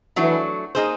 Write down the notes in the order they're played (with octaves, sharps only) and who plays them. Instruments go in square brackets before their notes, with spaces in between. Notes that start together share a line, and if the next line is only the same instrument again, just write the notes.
[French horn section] E3 [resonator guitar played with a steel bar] F#3 A3 D4 F#4
[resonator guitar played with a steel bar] A#3 D#4 G#4 C5